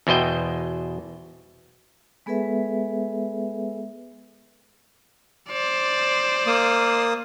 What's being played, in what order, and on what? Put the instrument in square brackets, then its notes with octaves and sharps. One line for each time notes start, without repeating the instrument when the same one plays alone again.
[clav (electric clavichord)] E2 B2 C5 D#5 G5
[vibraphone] G#3 B3 G#4 A4 B4 E5
[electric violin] C5 D5
[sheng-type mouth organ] A#3 D#6